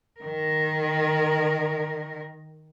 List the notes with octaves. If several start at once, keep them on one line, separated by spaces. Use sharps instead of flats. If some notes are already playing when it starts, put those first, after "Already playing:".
D#3 A#4